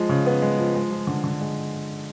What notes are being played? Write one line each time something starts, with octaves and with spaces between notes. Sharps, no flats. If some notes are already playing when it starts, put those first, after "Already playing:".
Already playing: F3 G#3
C#3
B3
G#3
F3
G#3
F3
D3
D3
G#3